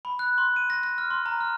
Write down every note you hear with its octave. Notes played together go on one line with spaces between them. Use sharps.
B5
F#6
C6
D#7
A#6
A#6
F6
C6
A#5
F6